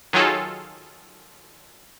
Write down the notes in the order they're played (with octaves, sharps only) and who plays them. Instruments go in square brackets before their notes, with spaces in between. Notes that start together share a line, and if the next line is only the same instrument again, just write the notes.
[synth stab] D#3 F#3 F4 G#4 A4